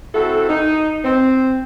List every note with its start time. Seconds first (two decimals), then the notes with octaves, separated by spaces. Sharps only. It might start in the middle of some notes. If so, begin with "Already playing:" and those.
0.15 C4 E4 F#4 A4
0.49 D#4
1.05 C4